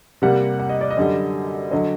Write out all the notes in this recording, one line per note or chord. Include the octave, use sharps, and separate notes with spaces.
C3 G3 A#3 F#5
F#5
D#5
D5
D#5
F#2 D3 G3
D3 F#3 D#5